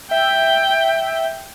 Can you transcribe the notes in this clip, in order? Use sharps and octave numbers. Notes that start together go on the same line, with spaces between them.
E5 G5